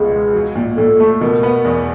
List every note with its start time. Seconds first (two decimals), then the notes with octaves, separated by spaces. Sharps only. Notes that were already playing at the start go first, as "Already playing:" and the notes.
Already playing: C#2 B2 B3 G#4
0.11 G#3
0.33 F#3
0.55 A#2
0.77 A#2 A4
1.00 A3
1.21 B2 A#4
1.43 B3
1.65 E2